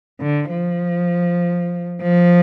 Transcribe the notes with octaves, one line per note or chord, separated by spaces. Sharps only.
D3
F3
F3